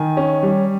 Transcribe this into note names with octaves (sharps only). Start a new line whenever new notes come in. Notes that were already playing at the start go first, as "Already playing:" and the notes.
Already playing: D#3 G#5
C#4
G3